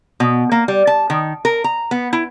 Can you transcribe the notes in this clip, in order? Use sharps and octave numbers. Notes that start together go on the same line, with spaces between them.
B2
A#3
G3
A5
D#3
A#4
A#5
B3
E4